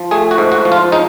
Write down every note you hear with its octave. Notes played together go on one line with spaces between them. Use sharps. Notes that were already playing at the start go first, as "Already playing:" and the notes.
Already playing: F3
A3 G#4
F#4
G#2
F#4
F3
F4
G#3 D#4